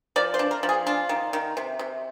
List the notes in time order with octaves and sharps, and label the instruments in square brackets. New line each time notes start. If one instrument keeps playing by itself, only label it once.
[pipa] F3 D5
C5
D4
A#4
F3
G#4
D4 F4
D#3
D#3
C3
C3